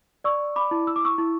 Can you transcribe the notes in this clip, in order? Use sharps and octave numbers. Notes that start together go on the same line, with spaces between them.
D5 C#6 E6
B5 D6
E4
E6
D6
C#6 E6
E4